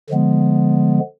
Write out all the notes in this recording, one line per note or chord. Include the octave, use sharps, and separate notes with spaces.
D3 F3 G#3 B3